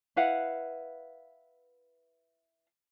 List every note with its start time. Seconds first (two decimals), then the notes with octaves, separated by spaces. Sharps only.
0.16 E4 B4 F5 F#5